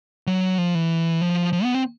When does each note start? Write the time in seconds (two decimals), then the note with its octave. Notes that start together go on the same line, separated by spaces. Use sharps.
0.27 F#3
0.58 F3
0.75 E3
1.22 F3
1.53 F3
1.64 B3
1.74 C4